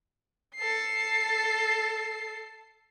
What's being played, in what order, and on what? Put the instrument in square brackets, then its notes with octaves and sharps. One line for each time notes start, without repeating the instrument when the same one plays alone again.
[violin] A4 C7